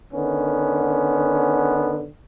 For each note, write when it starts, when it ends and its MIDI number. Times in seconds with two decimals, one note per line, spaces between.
0.14 2.04 50
0.14 2.04 51
0.14 2.04 59
0.14 2.04 61